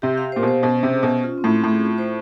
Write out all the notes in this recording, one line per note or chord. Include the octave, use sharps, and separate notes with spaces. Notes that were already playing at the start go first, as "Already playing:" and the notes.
C3 G4
F5
A#2 C5
B2
C5
B2 C#4
C3 C#4
G#4
B2
C#4
F4
C4
A2
C4
A2 G#4
F4
C5